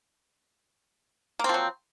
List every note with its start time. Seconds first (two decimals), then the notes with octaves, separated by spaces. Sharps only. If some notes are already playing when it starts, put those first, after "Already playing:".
1.39 A#3
1.44 C4
1.49 F3
1.54 F#3